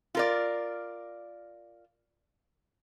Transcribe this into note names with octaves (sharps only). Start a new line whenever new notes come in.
F4 A#4 D5